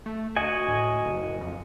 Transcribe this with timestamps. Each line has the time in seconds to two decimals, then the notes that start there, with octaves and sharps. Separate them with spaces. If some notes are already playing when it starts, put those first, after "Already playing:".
0.06 A3
0.36 D2 F#4 D#5 G#5
0.68 A2
1.06 F#1
1.41 F2